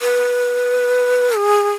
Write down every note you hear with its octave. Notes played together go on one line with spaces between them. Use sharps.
B4
G#4